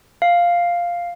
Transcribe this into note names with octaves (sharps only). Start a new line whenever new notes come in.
F5